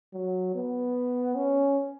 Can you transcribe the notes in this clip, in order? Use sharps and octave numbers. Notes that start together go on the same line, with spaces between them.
F#3
B3
C#4